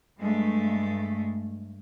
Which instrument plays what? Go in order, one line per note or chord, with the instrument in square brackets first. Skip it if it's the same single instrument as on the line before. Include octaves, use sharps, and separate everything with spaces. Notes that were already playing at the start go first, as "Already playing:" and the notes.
[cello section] G2 G#3 A3